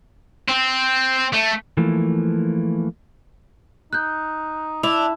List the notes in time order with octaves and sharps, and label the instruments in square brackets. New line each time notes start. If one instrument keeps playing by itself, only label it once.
[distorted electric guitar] C4
A3
[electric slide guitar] E3 F3 A3 A#3
[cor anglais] D#4 [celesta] F#6 G6
[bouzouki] D4 [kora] E4 [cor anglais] E5 [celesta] F7